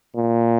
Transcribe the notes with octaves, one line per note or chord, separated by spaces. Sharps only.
A#2